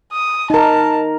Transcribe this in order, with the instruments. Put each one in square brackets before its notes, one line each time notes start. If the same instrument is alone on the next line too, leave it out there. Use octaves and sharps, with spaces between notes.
[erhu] D#6
[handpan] D#4 A#4 [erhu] A5